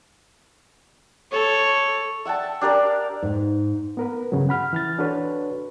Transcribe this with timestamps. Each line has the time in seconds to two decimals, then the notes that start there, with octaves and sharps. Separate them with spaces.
1.32 A4 C#5
2.25 E5 F#5 G5 A5
2.61 D4 G4 A#4 D5
3.23 G#2
3.97 B3 A#4 B4
4.32 G2 C#3 F#3
4.49 F#5 B5 F6
4.73 E3 F6 A6
4.99 D4 F#4 A4 B4 C#5